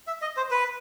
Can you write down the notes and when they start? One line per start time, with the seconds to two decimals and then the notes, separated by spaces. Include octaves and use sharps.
0.07 E5
0.21 D#5
0.37 C5
0.51 B4